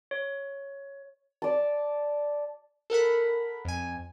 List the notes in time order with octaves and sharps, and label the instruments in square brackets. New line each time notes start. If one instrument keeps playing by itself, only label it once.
[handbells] C#5
[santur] D5 A5
[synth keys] A4 A#4 F#5 B5
F2 G#5